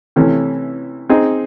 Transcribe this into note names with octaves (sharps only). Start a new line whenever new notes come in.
C3 E3 A3 C#4
C4 D#4 G#4